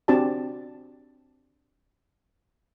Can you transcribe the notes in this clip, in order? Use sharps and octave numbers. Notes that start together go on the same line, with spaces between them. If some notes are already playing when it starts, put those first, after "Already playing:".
C4 D4 F#4 G4 D5 A5